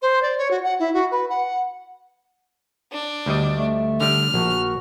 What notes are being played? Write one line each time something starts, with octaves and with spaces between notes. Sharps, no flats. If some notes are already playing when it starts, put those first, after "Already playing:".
C5
D5
C#5
F#4
F#5
E4
F#4
B4
F#5
D4
D2 G3 D#5
A3
D3 G3 F6
A#1 F#4